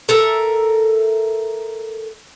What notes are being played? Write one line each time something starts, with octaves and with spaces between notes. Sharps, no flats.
A4 A#4 E5